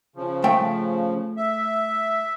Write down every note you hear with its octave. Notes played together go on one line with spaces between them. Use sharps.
C#3 F3
A3 G5
E5